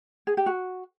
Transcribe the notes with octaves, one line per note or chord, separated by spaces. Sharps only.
G#4
G4
F#4